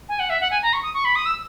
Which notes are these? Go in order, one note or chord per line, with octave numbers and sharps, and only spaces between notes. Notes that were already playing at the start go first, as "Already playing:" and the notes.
G#5
F#5
E5
F#5
G#5
A#5
C#6
D#6
C#6
B5
D#6
E6